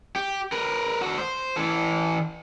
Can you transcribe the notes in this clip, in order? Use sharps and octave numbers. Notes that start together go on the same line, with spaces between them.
G4
A#4 B4
F#4 A4
C5
E3 A4